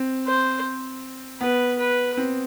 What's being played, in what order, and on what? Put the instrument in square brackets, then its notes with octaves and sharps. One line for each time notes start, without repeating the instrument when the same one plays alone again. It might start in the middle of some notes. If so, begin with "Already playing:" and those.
Already playing: [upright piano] C4
[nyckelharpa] C5
[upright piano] B3 [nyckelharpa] B4
[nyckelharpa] B4
[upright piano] C4